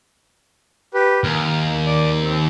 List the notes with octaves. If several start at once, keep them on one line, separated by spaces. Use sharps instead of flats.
G4 B4
D#2 F6
D5 D6
C4